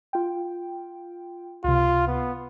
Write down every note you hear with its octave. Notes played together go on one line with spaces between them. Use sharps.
F4 G5
C#2 C3 F4
B3